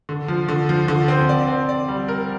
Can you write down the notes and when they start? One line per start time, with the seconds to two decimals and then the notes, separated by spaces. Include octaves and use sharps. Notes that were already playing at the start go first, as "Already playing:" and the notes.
0.09 D3
0.28 F3
0.49 D3
0.69 F3
0.88 D3
1.08 C4
1.29 D5
1.48 C4
1.69 D5
1.88 G3
2.08 A#4